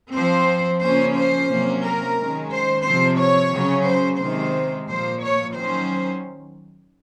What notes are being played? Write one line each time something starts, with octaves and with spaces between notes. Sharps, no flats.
F3 C4 C5
C#3 F3 A#3 C#4 C5
C5
C3 F#3 A#3 C#4
A#4
D#3 G#3 C#4
C5
C3 F3 C4 C5
C#5
C#3 F#3 C#4
C5
C3 D#3 G#3 C5
A#2 F3 A#3 C5
C#5
D#3 F#3 C#4 C5